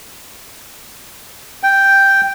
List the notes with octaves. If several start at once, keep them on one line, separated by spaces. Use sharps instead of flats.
G5